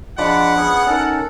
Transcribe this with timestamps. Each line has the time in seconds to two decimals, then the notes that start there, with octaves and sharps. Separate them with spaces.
0.18 F3 G#3 D4 F4 F#5 B5 D6
0.56 B3 C#4 G#4
0.87 C#4 D#4 A4 A#4